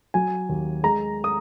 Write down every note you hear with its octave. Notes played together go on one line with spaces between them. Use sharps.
F#3 G#5
D#2
G#3 A#5
D#6